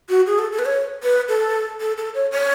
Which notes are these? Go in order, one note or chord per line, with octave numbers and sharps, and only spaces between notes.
F#4
G#4
A4
A4
B4
C#5
B4
A4
A4
A4
C#5
C#5